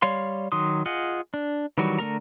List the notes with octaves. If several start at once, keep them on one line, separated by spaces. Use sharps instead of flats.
G3 C#5 D5 F5 C6
D#3 F#3 C6 D#6
F4 G#4 D#5 F#5
D4
D#3 E3 F#3 G3 F#4
D3 A3 A#4 A#5